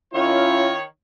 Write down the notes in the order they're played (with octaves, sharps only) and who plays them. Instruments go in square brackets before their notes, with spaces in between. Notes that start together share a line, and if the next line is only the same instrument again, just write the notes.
[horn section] D#3 C#5 [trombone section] C#4 E4 F4